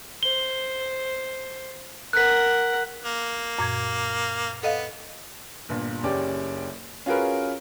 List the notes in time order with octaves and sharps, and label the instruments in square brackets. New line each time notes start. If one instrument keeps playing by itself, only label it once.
[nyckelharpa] C5 [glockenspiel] G7
[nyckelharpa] A#4 F#5 [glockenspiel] F#6 B6
[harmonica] A#3
[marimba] F#2 A#2 G#6
[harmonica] B3 [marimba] A4 D#5 F5
[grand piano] G1 A#2
F#1 C#4 G4 D5
C#4 F4 F#4 G#4 A#4 B4